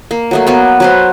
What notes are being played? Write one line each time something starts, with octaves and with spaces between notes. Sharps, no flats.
A#3
F#3 A3 A#3
F#3 A#3 B3
F#3 B4 C5